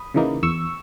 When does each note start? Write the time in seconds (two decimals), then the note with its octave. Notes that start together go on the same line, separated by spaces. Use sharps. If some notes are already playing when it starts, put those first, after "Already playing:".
Already playing: B5 D#6
0.14 C#3 E3 A#3 D#4
0.43 E2 C#6 E6